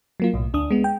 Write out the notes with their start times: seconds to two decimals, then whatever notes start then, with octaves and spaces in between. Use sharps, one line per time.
0.20 F#3 A#3 F4
0.34 B1 A2
0.53 D2 D4 D#6
0.71 G#3 B3
0.84 G5